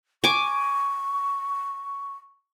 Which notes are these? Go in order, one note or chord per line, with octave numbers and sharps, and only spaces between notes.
G#5 C#6 D6